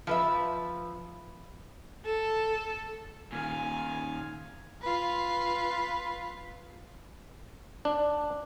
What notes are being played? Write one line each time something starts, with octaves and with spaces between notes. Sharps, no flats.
F3 B4 E5
A4
A#2 D#3 F5 G#5
F4 B4
D4